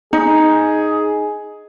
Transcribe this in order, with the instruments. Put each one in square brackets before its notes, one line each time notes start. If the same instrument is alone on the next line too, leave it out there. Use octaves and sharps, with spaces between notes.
[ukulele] D#4 [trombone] G#4